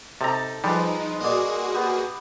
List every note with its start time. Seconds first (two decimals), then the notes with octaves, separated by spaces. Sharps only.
0.21 C3 D#4 A4 A5 A#5
0.64 F3 G3 G#3 D#4 B4
1.21 A#3 F#4 G#4 D5 D#5
1.74 B3 G4